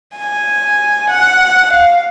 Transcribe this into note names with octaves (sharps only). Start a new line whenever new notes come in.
G#5
F#5
F5